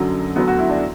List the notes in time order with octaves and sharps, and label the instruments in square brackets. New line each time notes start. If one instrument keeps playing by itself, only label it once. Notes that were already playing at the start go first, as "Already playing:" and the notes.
Already playing: [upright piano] F#2 D3 F#3
D2 D3 F#3 B3
F#4
E4
D4